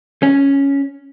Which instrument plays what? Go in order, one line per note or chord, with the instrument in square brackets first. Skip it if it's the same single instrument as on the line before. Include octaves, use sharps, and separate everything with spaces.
[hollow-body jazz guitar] C#4